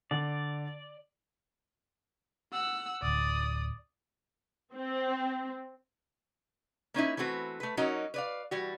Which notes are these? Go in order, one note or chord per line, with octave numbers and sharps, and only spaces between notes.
D3 D5
F#5 E6
D1 D2 D5 D#6
C4
A#3 C#4 D#4 E4
E3 A3 B3 C4 F#4 B4
A3 B4
F#3 C#4 D#4 F#4 A#4 D#5
B4 D5 F5
E3 G3 F#4